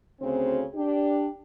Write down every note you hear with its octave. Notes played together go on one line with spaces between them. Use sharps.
D2 C#3 C4
D4 G4